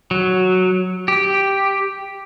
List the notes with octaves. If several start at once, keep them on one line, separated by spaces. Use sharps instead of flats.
F#3
G4